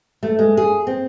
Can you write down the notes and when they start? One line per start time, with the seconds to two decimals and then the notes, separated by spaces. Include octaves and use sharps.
0.23 A3
0.39 G#3
0.57 G#4
0.87 C4